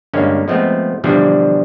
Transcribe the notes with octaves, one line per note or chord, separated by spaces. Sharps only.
G2 D3 G#3 A#3 C#4
F3 G#3 A3 B3 C4
B2 D3 E3 F3 G3 D4